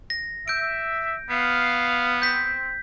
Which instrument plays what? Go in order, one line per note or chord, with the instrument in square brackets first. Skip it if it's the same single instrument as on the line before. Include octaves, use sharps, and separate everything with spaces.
[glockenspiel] A#6
[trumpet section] E5 [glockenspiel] G6 D7
[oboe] B3 [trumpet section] F5
[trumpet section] C4 [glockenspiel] G6 B6